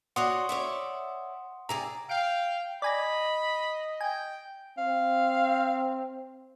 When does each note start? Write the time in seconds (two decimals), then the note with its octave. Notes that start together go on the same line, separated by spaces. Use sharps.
0.16 F#4 C#5 D5 F#5 C6 D#6
0.49 C#5 D5 E5
1.69 C3 G#4 D5 A#5
2.09 F5 G5 D7
2.82 D5 D#5 G#5 A#5 B5
4.01 G5 G#5
4.78 C4 F5